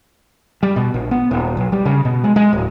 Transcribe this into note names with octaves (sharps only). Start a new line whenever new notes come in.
G3
B2
A#1
B3
D#1
B1
G3
C#3
B2
G#3
G#3
D1